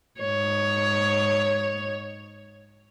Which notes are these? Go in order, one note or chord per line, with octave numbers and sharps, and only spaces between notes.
G#2 C#5